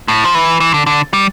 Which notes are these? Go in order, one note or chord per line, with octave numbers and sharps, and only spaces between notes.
A2
F3
E3
E3
D3
D3
G3